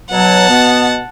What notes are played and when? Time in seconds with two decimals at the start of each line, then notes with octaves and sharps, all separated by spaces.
0.11 B2 F#3 F#5 A5
0.49 B2 B3